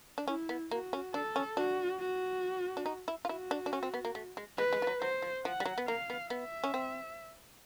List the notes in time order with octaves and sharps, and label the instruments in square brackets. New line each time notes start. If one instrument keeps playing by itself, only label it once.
[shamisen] D4
[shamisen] C#4 [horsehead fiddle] E4
[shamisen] B3
[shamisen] A#3 [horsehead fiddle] F#4
[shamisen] C#4
[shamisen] D4 [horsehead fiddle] A4
[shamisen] C#4
[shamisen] D4 [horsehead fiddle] F#4
[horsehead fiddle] F#4
[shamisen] D4
D#4
E4
F4
[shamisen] E4 [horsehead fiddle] F#4
[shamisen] D4
D4
C#4
C4
B3
A#3
A3
G#3
[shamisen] G#3 [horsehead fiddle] B4
[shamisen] G#3
F3
F#3
[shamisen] F#3 [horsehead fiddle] C5
[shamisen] F3
[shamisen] F3 [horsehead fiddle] F#5
[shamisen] G3
F#3
B3
[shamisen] A#3 [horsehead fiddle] F5
[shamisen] B3
[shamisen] B3 [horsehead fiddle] E5
[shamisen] C#4
C4